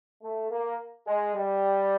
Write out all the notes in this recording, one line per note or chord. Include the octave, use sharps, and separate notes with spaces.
A3
A#3
G#3
G3